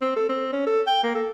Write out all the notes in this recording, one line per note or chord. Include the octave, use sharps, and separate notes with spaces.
C4
A4
C4
C#4
A4
G5
A#3
A4